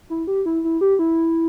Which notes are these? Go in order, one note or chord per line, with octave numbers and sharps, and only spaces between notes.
E4
G4
E4
E4
G4
E4